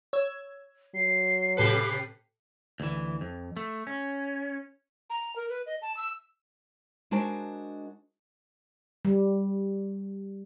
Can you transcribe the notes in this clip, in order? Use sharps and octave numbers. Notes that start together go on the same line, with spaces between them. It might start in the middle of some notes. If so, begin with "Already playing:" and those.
C#5 E6 G#6
F#3 C7
A2 C3 G4 A4 B4 C#7
D2 E3
F2
A3
C#4
A#5
A#4
B4
D#5
A5
E6
G#3 D4 F#4 A#4 C5 A5
G3